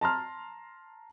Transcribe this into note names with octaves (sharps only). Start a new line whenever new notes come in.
A5 A#5 C6 F6